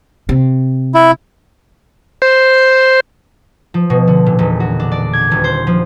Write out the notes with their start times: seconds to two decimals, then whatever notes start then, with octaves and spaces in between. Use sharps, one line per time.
0.29 C3
0.94 E4
2.22 C5
3.74 F3
3.90 B2
4.07 D3
4.26 A#2
4.39 E1
4.60 F#4
4.80 D4
4.92 D5
5.13 G#6
5.31 D#1
5.44 C5
5.67 F3